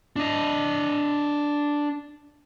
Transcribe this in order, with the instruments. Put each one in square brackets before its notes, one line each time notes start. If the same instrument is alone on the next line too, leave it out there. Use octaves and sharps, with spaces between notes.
[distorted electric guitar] D4 D#5